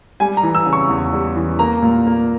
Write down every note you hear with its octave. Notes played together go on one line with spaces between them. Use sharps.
G3 G#5
A#5
E3
E6
C#3
C#6
E2
G3
E3
A#3 A#5
A#2
A#3